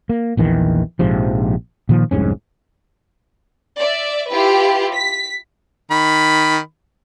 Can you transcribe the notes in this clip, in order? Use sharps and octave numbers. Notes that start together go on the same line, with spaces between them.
A#3
A#1 E2 D#3 E3
A#1 G#2 C3 F3
A#2 D#3 F3
F1 C2 G#2 C#4
D5 E5
E4 F4 G4 B4
B6
D#3 B5